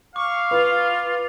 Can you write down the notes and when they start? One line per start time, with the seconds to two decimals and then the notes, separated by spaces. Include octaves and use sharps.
0.16 F5 C#6 D6
0.51 F4 B4